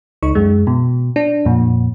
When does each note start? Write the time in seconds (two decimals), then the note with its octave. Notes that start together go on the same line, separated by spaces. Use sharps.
0.23 C#2 D#4 C#6
0.35 F#2 G#3
0.67 B2
1.16 D4
1.46 F2 A#2